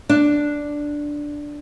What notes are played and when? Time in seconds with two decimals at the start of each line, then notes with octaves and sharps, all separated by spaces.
0.09 D4